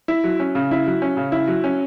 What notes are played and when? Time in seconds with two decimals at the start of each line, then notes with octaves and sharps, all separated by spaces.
0.08 E4
0.24 F#3
0.40 C#4
0.55 C#3
0.71 E4
0.87 F#3
1.02 C#4
1.17 C#3
1.32 E4
1.48 F#3
1.64 C#4